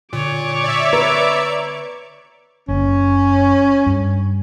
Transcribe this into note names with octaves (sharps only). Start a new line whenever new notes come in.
A#2 D3 C#5 D6
D5 E5
B4 A#5
F#1 C#4
G2